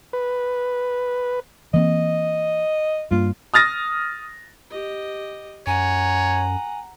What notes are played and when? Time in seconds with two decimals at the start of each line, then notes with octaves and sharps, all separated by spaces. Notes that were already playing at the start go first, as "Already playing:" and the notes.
0.13 B4
1.74 E3 A#3 C4 D#5
3.11 G2 A#3 F4
3.54 D#6 F6 A6 A#6
4.71 G4 D#5
5.67 F#2 C#5 F#5 G#5 A#5